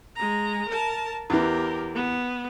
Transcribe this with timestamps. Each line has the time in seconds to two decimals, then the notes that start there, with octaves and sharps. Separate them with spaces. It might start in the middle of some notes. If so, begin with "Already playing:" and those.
0.16 G#3 A#5
0.69 A#4 A5
1.30 E2 E3 G4 A#4
1.95 B3